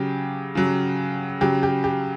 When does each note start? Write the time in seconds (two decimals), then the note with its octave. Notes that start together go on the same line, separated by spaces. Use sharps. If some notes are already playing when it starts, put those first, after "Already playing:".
Already playing: C#3 F#3 G4
0.55 C#3 F#3
1.41 C#3 F#3 G4
1.63 G4
1.84 G4